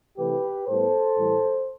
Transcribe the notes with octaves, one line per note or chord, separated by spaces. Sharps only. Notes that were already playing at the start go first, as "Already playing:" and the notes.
C3 E3 A3 G4 B4
A2 G3 B3 A4 C5
A2 E3 G3